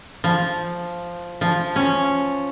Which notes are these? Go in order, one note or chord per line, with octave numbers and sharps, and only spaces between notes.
F3
F3
C#4